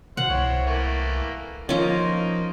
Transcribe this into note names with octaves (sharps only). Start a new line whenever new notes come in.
B2 C5 F5 F#5
C2 C4 E4 C#5
E3 A3 A#3
F3 A#3 C#4 D#4 F4